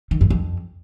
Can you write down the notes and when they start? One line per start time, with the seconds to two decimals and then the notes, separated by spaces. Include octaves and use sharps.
0.11 D#3
0.21 F#2
0.30 F2